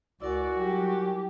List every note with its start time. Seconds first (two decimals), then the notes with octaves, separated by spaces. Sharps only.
0.22 C#2 E4 F#4 A#4 D5 G#5
0.57 F#3 G3 G4